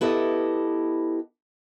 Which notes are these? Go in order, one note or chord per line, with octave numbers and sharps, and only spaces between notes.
B3 E4 G4 A4 D#5